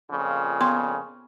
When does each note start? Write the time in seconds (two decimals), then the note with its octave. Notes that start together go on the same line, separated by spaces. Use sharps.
0.11 F2 A#2 C#3
0.61 B3 C6